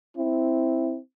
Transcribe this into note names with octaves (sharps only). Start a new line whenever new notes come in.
C4 E4